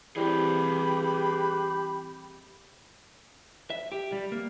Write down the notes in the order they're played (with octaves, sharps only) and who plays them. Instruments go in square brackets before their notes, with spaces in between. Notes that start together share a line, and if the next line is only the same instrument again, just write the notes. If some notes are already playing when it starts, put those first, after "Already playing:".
[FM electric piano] E3 G3 C4 [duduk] G4 [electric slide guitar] G#4 B4 G5 [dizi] B5
[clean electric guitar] E5
G4
G3
A#3